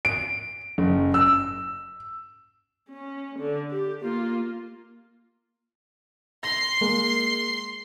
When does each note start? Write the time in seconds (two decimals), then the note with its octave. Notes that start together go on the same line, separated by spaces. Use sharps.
0.05 D7
0.78 F#1
1.14 E6
2.90 C#4
3.39 D3
3.71 G4
4.01 A#3 F4
6.43 C6 A#6 C7
6.81 G#3 A#3